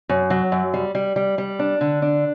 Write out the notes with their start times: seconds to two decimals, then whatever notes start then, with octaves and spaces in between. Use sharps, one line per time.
0.09 F#2
0.30 F#3
0.52 F#2
0.74 G3
0.95 G3
1.16 G3
1.38 G3
1.59 D4
1.81 D3
2.02 D4